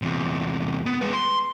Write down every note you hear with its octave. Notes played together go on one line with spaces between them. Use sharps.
E2 C3
B3
G#3 B4
C6